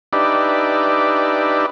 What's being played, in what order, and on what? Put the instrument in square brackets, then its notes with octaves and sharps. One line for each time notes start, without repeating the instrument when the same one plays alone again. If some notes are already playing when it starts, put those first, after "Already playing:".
[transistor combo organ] D4 D#4 G4 B4 D5 E5